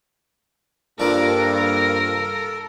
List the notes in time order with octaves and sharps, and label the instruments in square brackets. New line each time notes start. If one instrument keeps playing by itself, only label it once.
[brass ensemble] G2 A#3 [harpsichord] F3 D4 [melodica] A4 [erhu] A#4